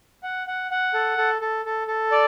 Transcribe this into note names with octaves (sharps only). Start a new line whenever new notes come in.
F#5
F#5
F#5
A4
A4
A4
A4
A4
D5